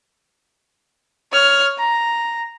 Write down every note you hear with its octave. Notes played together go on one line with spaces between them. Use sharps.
C#5 F6
A#5